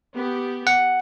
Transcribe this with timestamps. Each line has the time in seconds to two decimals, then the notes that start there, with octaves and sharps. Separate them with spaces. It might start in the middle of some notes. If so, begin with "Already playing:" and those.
0.16 B3 G4
0.67 F#5